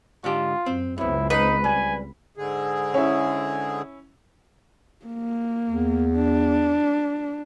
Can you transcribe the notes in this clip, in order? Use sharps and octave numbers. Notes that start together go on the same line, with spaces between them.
G#2 D3 F4 G4
F#2 C4
C#2 F#2 B3 C4 E4
D#4 B4
G3 G#5
G#2 D3 G#4
C#4 E4
A#3
E2
D4